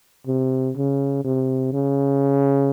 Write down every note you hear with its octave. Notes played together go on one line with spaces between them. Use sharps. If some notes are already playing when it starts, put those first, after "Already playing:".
C3
C#3
C3
C#3